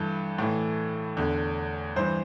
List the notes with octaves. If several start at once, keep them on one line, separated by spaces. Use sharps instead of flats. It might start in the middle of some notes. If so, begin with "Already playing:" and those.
Already playing: G2 E3 A4
A2 E3
E2 D3
G2 E3 C5